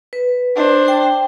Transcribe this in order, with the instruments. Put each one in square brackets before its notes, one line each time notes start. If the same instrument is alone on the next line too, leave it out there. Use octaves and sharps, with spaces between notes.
[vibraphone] B4
[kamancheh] D4 C5
[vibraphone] G5